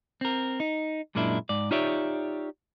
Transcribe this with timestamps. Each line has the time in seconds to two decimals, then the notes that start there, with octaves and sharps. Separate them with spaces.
0.21 C4 A#4
0.60 D#4
1.15 F#2 A#2 G#3 A#3 D4 E4
1.49 G#2 D5
1.71 D#4 F4 G4 C#5 D5 E5